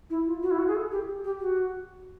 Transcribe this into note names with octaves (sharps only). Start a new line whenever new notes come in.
E4
F4
F#4
E4
F#4
G#4
A4
G4
G4
F#4